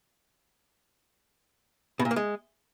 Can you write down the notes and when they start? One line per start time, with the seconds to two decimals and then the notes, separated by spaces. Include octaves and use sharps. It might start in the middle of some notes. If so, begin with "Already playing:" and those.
1.99 B2
2.05 A#2
2.11 A#3
2.16 G#3